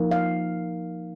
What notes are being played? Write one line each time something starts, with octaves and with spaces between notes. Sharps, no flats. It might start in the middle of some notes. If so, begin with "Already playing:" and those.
Already playing: F3 A#3 D#4
F5